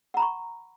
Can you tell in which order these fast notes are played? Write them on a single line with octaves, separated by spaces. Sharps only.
F#5 A#5 B5 C#6